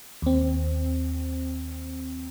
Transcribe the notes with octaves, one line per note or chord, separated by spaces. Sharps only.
D#2 C4